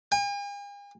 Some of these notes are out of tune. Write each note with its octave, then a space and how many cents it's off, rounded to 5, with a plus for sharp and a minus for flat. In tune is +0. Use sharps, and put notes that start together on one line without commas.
G#5 -45